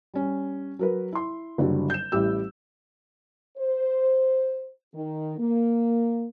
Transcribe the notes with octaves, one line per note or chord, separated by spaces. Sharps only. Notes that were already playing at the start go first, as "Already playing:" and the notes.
G3 C#4
F#3 A#4 B4
E4 C6
F#1 D3 F#3 G3
G6 E7
A1 G3 E4 G4 E6
C5
D#3
A#3